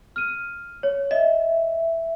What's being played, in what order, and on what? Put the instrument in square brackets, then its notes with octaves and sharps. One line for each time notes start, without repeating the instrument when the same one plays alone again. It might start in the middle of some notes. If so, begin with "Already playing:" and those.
[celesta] F6 D#7
C#5
[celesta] D#5 [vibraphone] E5